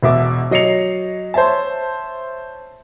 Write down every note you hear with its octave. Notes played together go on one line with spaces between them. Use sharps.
E1 B2 E5 D6
F#3 D#5 C7 C#7 F7
C5 C#5 E5 A5